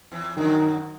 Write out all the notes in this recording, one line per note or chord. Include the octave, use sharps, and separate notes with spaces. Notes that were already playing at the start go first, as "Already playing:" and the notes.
E2 E3
F#2 D#3 F#3